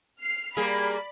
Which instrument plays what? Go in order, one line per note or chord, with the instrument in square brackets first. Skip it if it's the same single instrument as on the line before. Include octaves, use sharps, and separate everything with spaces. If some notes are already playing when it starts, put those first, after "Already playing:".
[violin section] F6 C7
[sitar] G3 A#3 G#4 [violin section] D5 B5